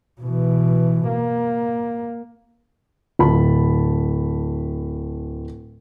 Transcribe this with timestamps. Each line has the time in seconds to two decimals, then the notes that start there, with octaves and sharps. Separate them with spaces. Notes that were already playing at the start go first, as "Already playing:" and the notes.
0.21 B2 E3
1.08 A#3
3.19 D1 A5 B5